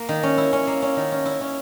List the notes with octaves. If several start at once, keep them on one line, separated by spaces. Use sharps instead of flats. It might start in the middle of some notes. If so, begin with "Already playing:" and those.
Already playing: A#3
D#3
C#4
E4
C#4
A#3
C#4
D#3
C#4
E4
C#4